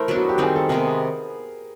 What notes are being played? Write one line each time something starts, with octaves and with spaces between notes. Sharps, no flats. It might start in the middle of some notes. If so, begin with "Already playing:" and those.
Already playing: A3 E4 A#4 C5
F#3 B3 D4
F#4
G4
D#3 G3 C4 D#4 G#4
A4
C3 D#3 G#3 B3 G#4 A#4